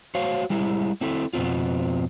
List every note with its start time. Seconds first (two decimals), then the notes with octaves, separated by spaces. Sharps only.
0.15 F#4 C5 C#5 F5
0.50 G3 G#3 E4
1.01 C4 E4 A4
1.33 F2 B2 B3 C4 F4